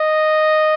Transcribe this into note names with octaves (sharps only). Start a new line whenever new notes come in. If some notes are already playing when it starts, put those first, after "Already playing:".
Already playing: D#5